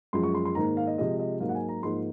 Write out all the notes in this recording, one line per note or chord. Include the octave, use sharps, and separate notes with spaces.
F#2 F3 G#3 C6
C#6
C6
C6
G#2 D#3 A#3 A#5
F5
D#5
C3 F3 G#3 D#5
D#5
G#2 F#3 A#3 F5
F#5
G#5
A#5
G#2 F3 A#3 C6